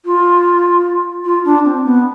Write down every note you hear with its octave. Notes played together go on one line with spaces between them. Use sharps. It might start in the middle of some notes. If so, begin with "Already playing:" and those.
F4
F4
D4
C4
B3